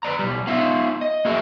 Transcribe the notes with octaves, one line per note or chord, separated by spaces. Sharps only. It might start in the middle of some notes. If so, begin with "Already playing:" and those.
B4 C#5 D5 A#5
B1 G3
B3 D#4 F4 E5 F5
D#5
A#3 F#4 G#4 A#4 E5